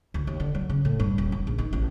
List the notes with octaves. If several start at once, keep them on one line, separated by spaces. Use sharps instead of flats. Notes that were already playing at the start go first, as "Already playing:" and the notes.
D2
D#2
D3
F#3
C#3
A2
G2
D#1
F#2
A#1
D#3
A1